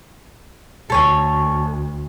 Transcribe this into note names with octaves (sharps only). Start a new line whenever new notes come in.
D2 A4 C#5 G#5